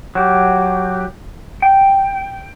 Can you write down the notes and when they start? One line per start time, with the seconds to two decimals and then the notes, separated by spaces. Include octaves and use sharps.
0.15 F#3 G4
1.62 G5